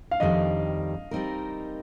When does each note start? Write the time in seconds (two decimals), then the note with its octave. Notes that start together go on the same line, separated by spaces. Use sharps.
0.11 F5
0.20 F2 D#3 G3 D#5
1.11 G3 C4 D#4 A#4